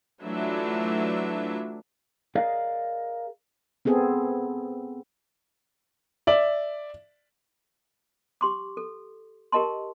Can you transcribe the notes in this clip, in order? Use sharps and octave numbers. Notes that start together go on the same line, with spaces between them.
E3 F#3 A3 D4 F4 E5
G#4 A#4 D5 D#5 F5
B3 C4 G#4 A4
D5 E5 F#7
G4 C6 D6
A4
G4 A#4 D#5 A5 C6